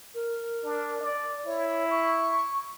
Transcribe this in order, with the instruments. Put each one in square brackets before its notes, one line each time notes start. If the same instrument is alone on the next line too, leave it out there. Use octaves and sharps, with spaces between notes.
[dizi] A#4
[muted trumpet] D4
D5
[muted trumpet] E4 [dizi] C#5
[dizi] C#6